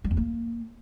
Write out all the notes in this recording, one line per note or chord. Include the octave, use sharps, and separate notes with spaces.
G3
E2
A#3